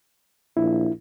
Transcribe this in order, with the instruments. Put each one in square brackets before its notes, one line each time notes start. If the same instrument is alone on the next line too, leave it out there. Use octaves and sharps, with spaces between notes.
[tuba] A#1 [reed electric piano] E4